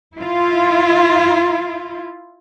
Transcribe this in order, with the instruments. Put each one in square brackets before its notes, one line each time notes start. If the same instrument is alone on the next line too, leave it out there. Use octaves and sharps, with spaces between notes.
[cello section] E4 F4